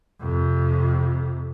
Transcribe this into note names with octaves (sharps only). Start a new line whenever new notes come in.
F2 C3